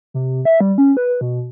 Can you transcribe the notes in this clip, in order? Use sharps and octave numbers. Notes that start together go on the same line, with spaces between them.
C3
E5
G3
C#4
B4
B2